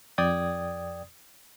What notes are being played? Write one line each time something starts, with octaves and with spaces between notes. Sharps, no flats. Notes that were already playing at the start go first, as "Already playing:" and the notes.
F2 D5 G5 D#6 G#6